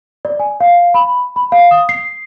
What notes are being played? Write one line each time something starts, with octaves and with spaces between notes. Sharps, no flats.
D5
G#5
F5
B5
B5
F5
D#6
C7